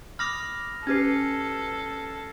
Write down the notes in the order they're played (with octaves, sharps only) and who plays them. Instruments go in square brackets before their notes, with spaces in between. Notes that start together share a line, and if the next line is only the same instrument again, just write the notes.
[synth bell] B5 D6 D#6 [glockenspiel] F6 A#6 F7
[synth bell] C#4 G4 B4 [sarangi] A4 [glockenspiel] G#6 A#6 C7